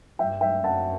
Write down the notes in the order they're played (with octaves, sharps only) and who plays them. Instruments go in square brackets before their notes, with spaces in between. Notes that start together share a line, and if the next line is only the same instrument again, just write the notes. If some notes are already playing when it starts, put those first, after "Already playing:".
[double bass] G2 [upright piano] E5 G5
[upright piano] E5 G5
[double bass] F#2 [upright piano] F#5 A5